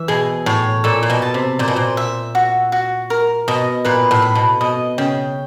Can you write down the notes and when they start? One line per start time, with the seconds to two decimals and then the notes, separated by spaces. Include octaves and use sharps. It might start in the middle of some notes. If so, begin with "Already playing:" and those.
Already playing: E3 E5
0.08 B2 G#4
0.46 A2 C#5
0.84 A#2 A4
1.03 A#2
1.10 B2
1.22 A5
1.34 C3
1.59 A#2 C5
1.68 B2
1.76 A#2
1.97 E5
2.35 F#4
2.72 F#4
3.10 A#4
3.48 B2 D#5
3.85 A#2 B4
4.11 A2
4.22 B5
4.35 B2
4.61 B2 D#5
4.98 C#3 G5